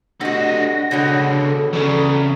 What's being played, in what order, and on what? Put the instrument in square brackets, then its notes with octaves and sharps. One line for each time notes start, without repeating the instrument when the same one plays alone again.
[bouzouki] C3 F#4 [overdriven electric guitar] A3 D#5 [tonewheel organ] D4 F#5 A#6
[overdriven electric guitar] C#2 D3 [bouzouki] B2 G#3 C#4
[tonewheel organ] A4
[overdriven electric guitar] C#3 [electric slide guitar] E3 D5